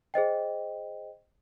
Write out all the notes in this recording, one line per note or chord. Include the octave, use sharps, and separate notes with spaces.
G#4 C5 D#5 G5